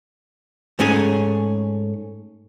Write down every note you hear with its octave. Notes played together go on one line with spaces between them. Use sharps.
G#2 A3 C#4 G#4 C#5